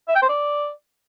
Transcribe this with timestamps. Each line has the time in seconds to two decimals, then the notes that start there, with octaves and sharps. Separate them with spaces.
0.08 E5
0.15 G5
0.22 C5
0.29 D5